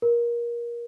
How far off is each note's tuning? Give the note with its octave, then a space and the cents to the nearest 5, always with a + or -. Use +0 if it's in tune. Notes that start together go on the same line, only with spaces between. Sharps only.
A#4 +25